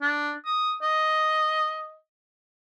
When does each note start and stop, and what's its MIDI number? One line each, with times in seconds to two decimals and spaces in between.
0.02 0.32 62
0.45 0.73 87
0.82 1.96 75